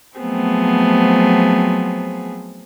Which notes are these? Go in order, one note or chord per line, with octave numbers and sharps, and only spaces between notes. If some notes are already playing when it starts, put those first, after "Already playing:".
F3 F#3 A3 B3 C4 G#4